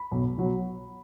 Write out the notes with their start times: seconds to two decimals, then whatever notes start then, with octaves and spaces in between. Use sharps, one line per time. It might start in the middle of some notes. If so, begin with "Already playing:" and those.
Already playing: B5
0.11 B1
0.38 B2 F#3